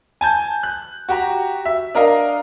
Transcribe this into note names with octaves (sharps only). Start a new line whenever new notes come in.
G#5 A5 G6
F#6
F#4 G4 A#5
E5
D4 A#4 D#5 F5